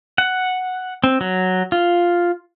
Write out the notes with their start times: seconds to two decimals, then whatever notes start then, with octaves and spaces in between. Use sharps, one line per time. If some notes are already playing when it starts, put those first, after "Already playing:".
0.18 F#5
1.04 C4
1.21 F#3
1.72 F4